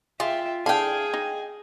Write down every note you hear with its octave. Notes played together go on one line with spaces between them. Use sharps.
F4 G#4 E5 G5
D4 E4 G#4 A4 F5 G5 G#5
D#4